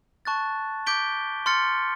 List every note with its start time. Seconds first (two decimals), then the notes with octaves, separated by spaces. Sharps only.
0.25 A5 C#6 F#6 A6
0.86 D6 G6 B6 D7 G7
1.46 C6 F6 A6 C#7